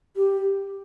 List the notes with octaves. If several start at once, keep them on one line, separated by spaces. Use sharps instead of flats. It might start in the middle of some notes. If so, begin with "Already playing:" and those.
G4